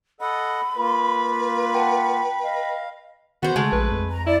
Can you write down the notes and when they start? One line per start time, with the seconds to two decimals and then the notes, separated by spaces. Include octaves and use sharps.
0.21 A4 D#5 F#5 B5
0.77 A#3 F4 B4
1.74 F#5 G5 A5
2.43 D#5 F5
3.43 D#3 B3 F#4 C5
3.56 C#3 G#3 A3
3.72 A#1 B4
3.91 F2
4.11 A#5
4.27 E4 D5